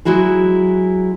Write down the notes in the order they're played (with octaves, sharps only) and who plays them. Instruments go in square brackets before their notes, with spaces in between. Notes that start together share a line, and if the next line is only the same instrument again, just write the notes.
[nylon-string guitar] F#3 G#3 E4 F#4 G#4